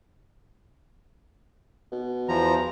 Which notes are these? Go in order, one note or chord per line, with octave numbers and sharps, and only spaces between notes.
B2
E2 F3 A#5